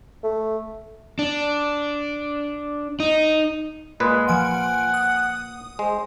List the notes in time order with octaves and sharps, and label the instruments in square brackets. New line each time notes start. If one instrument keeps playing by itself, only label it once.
[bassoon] A3
[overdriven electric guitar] D4
D#4
[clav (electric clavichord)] A#2 B4 [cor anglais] G#3
[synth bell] F3 G#5 D7 [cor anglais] F#5
[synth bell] D#6
[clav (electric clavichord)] G#3 [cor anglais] C5